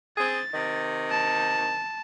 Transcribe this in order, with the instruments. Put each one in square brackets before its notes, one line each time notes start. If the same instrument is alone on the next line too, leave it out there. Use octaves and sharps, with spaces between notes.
[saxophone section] C4 G#4 [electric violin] A6
[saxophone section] C3 D#3
[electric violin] A5